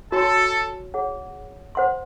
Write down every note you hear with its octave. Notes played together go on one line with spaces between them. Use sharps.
F#4 A4 C#5 G#5 C6
G#4 C#5 F#5
C5 F#5 C6